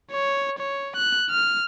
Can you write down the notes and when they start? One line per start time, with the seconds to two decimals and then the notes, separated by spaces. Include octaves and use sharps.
0.11 C#5
0.59 C#5
0.96 F#6
1.30 F6